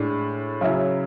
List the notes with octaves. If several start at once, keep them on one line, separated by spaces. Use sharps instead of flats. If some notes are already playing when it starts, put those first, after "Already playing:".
Already playing: A2 G#3 D4
C#3 F#3 C#4 E4